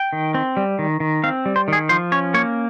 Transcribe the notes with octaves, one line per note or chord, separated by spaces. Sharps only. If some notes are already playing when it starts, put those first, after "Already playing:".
Already playing: G5
D#3
C4
G3
D#3
D#3
C4 F5
G3
C5
D#3 G#4
F3 C5
C#4 C#5
A#3 C#5